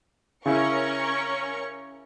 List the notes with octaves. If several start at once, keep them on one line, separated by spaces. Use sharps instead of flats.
C#3 C#4 E4 A#4 C#6